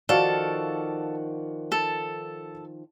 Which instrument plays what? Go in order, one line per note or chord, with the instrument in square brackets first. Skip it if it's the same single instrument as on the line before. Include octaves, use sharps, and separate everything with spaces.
[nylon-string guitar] D#3 F3 [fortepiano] F#4 D5 F5 [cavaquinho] A4
[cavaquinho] A4